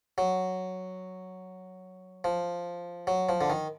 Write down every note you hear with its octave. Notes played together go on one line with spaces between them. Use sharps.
F#3
F3
F#3
F3
D3
D#3